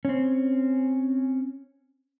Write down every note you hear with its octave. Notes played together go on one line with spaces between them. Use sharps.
C4 C#4